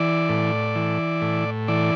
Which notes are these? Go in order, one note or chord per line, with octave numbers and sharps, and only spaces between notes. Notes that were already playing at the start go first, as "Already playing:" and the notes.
Already playing: E3 D5
A2
E3
A2
E3 D5